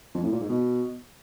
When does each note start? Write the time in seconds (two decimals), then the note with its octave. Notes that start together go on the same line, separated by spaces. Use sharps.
0.14 F2
0.23 A2
0.32 A#2
0.40 G#2
0.49 B2